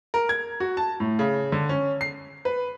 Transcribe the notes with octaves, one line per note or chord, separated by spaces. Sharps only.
A#4
G#6
F#4
A5
A2
C#3
D3
C#4
C7
B4